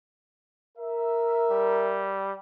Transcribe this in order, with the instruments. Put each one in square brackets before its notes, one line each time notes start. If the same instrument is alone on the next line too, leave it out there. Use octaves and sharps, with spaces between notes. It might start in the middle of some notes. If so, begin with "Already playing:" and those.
[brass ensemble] A#4 E5
[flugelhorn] G3